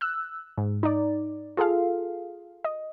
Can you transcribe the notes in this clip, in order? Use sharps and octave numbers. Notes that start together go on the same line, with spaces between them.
E6 F#6
G#2
D#4 D5
F4 G#4 A4 F5
D#5